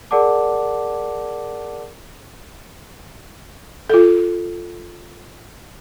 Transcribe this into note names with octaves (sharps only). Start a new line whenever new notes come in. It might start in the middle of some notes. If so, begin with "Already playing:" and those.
G#4 A#4 D5 F#5 A5 D6
F4 A4